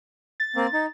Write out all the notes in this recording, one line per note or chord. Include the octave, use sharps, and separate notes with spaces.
A6
A#3 C4
D#4